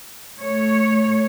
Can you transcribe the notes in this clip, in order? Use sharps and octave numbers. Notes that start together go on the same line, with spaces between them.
A3 C#5